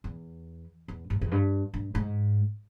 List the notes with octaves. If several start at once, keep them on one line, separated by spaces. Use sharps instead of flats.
E2
E2
G2
E2
G2
G2
G#2